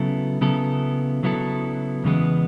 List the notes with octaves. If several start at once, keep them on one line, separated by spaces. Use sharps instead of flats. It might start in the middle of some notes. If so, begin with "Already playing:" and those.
Already playing: C#3 F#3 B3 E4 A4
C#3 F#3 B3 E4 A4
C#3 F#3 B3 E4 A4
E2 C#3 E3 G#3 B3